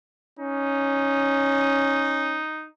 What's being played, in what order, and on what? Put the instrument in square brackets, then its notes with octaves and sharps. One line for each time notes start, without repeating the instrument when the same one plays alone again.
[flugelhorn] C#4 [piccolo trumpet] D#4